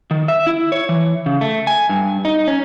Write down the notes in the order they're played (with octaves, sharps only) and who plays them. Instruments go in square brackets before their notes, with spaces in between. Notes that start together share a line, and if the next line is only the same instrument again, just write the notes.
[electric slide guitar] D#3
E5
E4
C#5
E3
C#3
A3
G#5
G2
D#4
C#4